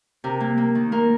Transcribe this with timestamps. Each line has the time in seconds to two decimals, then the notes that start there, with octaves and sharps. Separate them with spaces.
0.24 C3 A#4
0.40 A#3
0.58 A#3
0.75 D#3
0.92 A#3 A#4